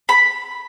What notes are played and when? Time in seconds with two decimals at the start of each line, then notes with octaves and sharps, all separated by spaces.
0.09 B5